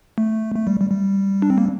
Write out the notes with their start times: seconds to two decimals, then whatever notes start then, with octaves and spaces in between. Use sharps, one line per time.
0.18 A3
0.55 A3
0.67 G3
0.80 G3
0.91 G3
1.42 D4
1.50 C4
1.58 A#3